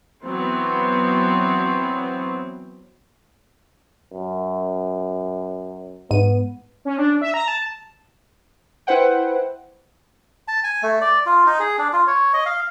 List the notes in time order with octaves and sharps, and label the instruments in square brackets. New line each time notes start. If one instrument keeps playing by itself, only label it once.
[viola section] E3 F#3 B3 C4
[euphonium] F#2
[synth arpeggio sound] G#2 D#7 [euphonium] B3
[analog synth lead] C#4
D4
E5
A#5
A5
[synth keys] E4 B4 C5 F#5 G5
[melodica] A5
G#5
A3
D5
F4
D#4
G#4
D4
F4
C#5
D#5
F5